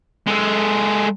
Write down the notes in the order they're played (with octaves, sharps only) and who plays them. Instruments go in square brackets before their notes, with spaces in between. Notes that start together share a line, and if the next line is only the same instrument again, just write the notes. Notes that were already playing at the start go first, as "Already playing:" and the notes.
[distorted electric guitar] G#3 A4